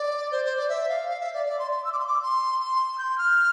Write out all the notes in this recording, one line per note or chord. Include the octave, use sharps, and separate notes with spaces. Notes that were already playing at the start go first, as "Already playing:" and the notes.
Already playing: D5
C5
C5
D5
E5
F5
F5
E5
D5
D5
C6
C6
E6
D6
C6
D6
C6
C6
G6
F6